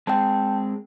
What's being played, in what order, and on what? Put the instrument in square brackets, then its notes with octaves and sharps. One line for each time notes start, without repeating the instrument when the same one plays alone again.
[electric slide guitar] G#3 C4 G#4 [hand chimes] G5 A5